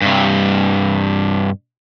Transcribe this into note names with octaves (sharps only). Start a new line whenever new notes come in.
G2 C3